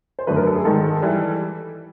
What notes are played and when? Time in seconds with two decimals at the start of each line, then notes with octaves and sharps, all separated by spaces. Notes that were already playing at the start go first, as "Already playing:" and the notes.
0.19 C5
0.27 F#2 D3 F#3 A3 B4
0.36 A#4
0.47 A4
0.55 G#4
0.65 G#2 D#3 G#3 A4
1.02 E3 G3